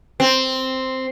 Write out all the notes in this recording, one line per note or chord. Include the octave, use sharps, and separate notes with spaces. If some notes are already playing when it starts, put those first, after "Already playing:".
C4